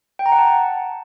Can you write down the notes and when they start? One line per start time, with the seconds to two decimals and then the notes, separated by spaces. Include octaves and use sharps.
0.19 G5
0.26 A#5
0.32 F#5
0.38 A5